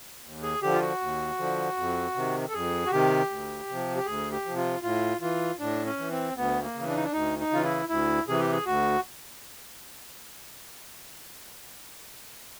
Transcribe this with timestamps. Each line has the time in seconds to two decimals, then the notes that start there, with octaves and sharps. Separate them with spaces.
0.24 D#2
0.42 G#4
0.62 D3 F3 G4
0.74 F4
0.81 F#4
1.01 D#2
1.38 D3 F3
1.77 F2
2.15 C3 D#3
2.48 A4
2.53 F2 G#4
2.86 F#4
2.91 C3 D#3 G4
3.30 D2
3.69 C3 F3
3.97 G4
4.06 D2 G#4
4.32 G4
4.46 C3 F3
4.57 F4
4.83 A2 F4
5.21 E3 F4
5.60 A2 D4
5.86 C#4
5.98 E3
6.11 C4
6.36 D2 B3
6.62 A#3
6.75 C#3 E3
6.88 D4
6.96 D#4
7.04 D4
7.13 D2 D#4
7.39 D#4
7.51 C#3 E3 F4
7.64 E4
7.89 D2 E4
8.27 C3 E3 G#4
8.40 G4
8.52 G#4
8.66 D2 F#4